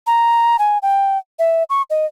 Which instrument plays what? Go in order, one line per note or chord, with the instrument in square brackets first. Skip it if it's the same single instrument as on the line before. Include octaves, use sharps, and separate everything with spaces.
[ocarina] A#5
G#5
G5
E5
C#6
D#5